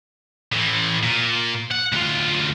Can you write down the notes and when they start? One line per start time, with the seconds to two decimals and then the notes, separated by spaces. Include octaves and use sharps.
0.53 A2 E3
1.03 A#2
1.71 F#5
1.92 D2 F4